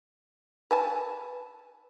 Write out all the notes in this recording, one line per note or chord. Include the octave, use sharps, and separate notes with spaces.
B4 G#5 A5